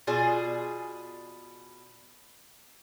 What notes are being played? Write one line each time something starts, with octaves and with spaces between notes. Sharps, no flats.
B2 F4 G#4 D5 G#5